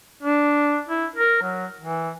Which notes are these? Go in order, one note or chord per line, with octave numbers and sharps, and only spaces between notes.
D4
E4
A#4
F#3
E3